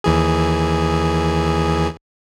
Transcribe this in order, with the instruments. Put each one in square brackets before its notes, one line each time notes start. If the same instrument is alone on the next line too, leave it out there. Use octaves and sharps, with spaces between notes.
[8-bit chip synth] D#2 E3 G#4